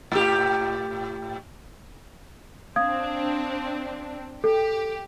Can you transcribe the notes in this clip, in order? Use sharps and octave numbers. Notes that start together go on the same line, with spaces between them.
A2 G4
C4 D4 F5 D#6 G#6
G4 A4